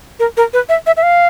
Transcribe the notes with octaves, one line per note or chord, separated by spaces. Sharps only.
A#4
A#4
B4
E5
E5
E5
F5